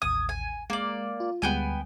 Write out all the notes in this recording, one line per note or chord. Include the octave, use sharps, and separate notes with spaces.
A1 D#2 D#6 G#6
G#5
G#3 A#3 D5
F4
D2 G3 G#3 B3 G5 G#5